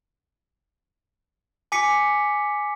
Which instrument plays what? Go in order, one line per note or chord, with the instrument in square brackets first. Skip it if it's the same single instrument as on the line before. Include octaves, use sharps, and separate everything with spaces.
[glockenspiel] G#5 D6 B6 C#7